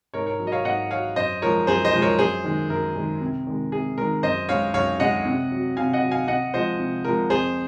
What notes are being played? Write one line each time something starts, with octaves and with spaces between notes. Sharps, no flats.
G#2 A#4 C#5
A#4 C#5
F#3
D#5
C#5 F5
G#2 D#5 F#5
F#3 C#5 F5
F#2 C5 D#5
F3 G#3 A#4 C#5
F#2 G#4 C5
C5 D#5
F3 G#3
A#4 C#5
F#2 G#4 C5
D#3 G#3
F#2 A#4
D#3 G#3
C3
D#3 G#3
C3 G#4
D#3 G#3 A#4
F#2 C5 D#5
C#3 G#3 C#5 F5
F#2 C#5 F5
C#3 G#3 D#5 F#5
C3
F#3
C3 F5 G#5
D#5 F#5
F#3
F5 G#5
C3 D#5 F#5
F3 G#3 C5 D#5
C3
F3 G#3 A#4
F2 G#4 C5